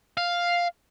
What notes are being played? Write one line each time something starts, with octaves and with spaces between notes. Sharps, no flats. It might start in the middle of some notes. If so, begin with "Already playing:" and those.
F5